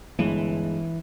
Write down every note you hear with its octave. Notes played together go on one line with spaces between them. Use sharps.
G1 E3 G#3